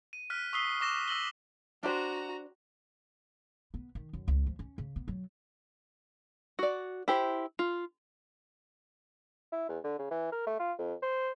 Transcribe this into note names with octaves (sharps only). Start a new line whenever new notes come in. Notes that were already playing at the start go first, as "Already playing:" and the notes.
D#7
F6 F#6 B6
C#6 D#6 E6 B6 C7 G7
C#6 D6 A#6 E7 G7
E6 A#6 F#7 G7
D4 F#4 G4 C5 A#5
B3
D#3
F#2
C#2
F3
C#4
C#3
B3
F#3
F#4 D5
E4 G4 C5
F4
E4
E2
D3
C#3
E3
A#4
A3
F4
F2
C5